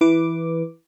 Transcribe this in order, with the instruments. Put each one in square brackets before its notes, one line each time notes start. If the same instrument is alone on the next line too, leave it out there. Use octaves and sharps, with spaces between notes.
[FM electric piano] E3 B4 D6